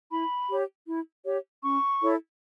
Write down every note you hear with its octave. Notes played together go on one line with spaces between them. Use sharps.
E4 B5
G4 C#5
E4
G4 C#5
C#4 C#6
E4 A4 C#5